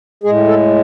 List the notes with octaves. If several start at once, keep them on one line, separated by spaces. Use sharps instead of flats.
A2 G#3 G#4
A4